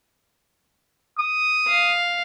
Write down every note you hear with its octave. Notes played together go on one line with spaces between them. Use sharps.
D#6
F5